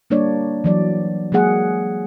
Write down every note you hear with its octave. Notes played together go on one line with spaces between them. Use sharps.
G3 A#3 D4 C#5 D5
E3 F#3 D5
F#3 G#3 A#3 G#4 F#5